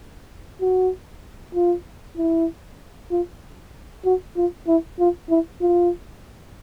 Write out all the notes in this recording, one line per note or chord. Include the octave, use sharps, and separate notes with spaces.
F#4
F4
E4
F4
F#4
F4
E4
F4
E4
F4